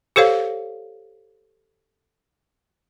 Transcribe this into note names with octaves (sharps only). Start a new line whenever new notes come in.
G4 A4 C5 C#5 F5